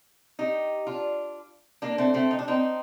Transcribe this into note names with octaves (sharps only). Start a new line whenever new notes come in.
D#4 G4
D4 F4
A#3 D4
A3 C4
A3 C4
D#4
D4
C4 D#4